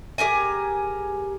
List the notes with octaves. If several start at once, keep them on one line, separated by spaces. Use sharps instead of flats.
G4 G#4 A#4 G#5